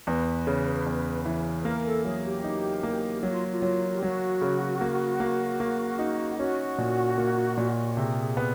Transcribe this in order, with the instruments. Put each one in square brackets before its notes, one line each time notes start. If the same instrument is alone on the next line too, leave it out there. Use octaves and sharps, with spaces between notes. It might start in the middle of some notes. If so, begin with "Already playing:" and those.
[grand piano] E2 [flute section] B4
[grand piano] C#3
E2
E3
[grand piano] A#3 [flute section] A#4
[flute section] A4
[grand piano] F#3 [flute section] G#4
[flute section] G4
[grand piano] D#4
A#3
[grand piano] F#3 [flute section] F#4
[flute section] F4
F4
[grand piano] F#3
[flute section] G4
[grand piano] F#3 [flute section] F#4
[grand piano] C#3
A#3
A#3
A#3
D#4
[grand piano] C#4 [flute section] F#4
[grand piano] A#2
A#3
A#2
[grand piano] C3 [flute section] G#4
[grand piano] B3